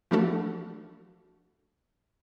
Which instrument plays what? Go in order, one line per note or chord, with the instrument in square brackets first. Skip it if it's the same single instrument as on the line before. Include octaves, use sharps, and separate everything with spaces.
[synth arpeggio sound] E3 F3 A3 D4 F#4 A4